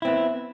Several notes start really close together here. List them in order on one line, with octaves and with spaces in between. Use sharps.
E4 C4 B3